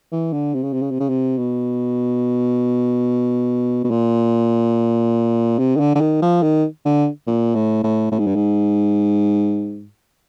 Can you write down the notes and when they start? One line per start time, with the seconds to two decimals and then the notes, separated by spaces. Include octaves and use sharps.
0.12 E3
0.33 D3
0.54 C3
0.63 C#3
0.73 C3
0.82 C#3
0.91 C3
1.00 C#3
1.09 C3
1.38 B2
3.84 B2
3.91 A#2
5.59 C3
5.76 D#3
5.80 D3
5.95 D3
6.01 D#3
6.22 F3
6.43 D#3
6.85 D3
7.27 A#2
7.55 A2
7.83 A2
8.11 A2
8.19 G#2
8.27 G2
8.35 G#2